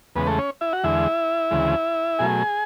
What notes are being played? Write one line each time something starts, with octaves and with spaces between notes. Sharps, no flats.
E2 C#3 G#3 B3 B4
A3 A4
C#4 C#5
E4 E5
F#4 F#5
E2 D3 G#3 E4 E5
D2 C#3 E3 G#3
B2 F#3 A3 G#4 G#5